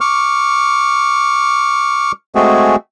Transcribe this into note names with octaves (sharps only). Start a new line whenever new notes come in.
C#6 D6 F6
G#3 A3 C4 F#4 G#4